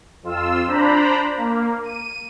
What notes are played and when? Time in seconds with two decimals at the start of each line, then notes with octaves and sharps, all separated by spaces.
0.23 F2 F4 E6
0.67 D4 C5 A#5 B5
1.37 A#3
1.84 D#7